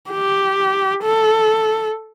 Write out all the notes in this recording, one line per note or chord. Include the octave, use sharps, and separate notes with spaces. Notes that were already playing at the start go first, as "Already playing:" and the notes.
G4
A4